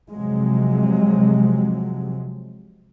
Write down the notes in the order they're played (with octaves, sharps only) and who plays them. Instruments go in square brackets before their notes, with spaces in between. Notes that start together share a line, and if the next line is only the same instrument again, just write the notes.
[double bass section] C3 F3 F#3 G#3